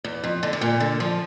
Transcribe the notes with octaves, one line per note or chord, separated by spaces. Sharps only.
E2
F2
D3
C3
A#2
D3
F3